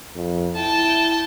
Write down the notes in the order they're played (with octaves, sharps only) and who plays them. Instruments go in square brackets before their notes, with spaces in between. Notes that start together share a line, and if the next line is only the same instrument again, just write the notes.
[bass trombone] F2
[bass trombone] E4 [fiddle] G5 A5